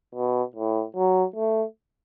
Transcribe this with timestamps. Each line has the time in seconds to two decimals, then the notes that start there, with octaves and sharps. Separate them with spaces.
0.15 B2
0.56 A2
0.96 F#3
1.36 A3